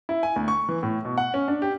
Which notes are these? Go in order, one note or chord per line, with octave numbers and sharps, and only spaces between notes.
E4
G#5
D2
C#6
E3
A2
B2
F#5
C#4
D4
G4